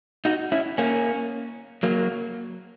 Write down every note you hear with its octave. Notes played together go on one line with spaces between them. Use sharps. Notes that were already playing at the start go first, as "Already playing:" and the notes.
D#4 F#4
C#4 E4
A#3 C#4
F#3 A#3